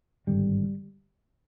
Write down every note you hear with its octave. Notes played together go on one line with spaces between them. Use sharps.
G#1 G2 D3 G3